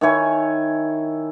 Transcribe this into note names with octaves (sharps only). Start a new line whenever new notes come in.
D#3 E4 C#5 G#5